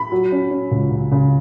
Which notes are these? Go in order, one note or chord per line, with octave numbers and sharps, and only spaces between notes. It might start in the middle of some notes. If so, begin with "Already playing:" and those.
Already playing: B5
F#3
C#4
C#4
C#2
C#3
C#3